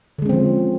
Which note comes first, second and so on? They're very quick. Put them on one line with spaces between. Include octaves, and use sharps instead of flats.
D3 G#3 C#4 C4 F3